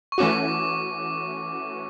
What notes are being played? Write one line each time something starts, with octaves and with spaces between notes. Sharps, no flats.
C#6
E3 A3 C#4 F#4 D6